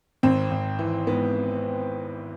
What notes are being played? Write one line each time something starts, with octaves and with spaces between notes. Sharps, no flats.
G#1 C4
G#1
E3
G#2 B3